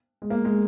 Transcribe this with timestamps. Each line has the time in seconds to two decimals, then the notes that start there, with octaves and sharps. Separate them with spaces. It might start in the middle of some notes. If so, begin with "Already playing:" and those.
0.22 G#3
0.30 A#3
0.45 G#3